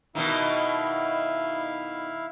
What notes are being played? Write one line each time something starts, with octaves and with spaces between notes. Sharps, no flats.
B2 D#3 E4 E5 F5